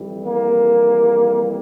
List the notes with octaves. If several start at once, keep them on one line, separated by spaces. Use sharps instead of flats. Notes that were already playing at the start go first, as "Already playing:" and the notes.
Already playing: F2 E3 G3
A#3